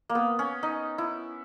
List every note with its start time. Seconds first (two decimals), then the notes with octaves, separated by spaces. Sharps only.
0.10 A#3
0.15 B3
0.39 C#4
0.63 D#4
0.98 E4